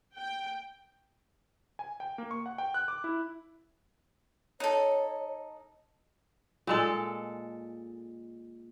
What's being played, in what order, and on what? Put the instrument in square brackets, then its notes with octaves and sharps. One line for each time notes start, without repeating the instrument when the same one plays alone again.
[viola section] G5
[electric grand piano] G#5
G5
A#3
C#6
F#5
G5
F#6
D6
E4
[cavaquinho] D#4 A4 [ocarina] C#5
[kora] A#2 G#3 A4